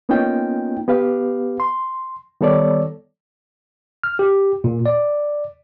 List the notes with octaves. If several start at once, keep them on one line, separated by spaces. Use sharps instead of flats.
A#3 B3 C#4 D#4 F4 G5
B3 G4 B4 F5
C6
D#3 G3 B3 A4 C#5 D5
F6
G4
A#2
D5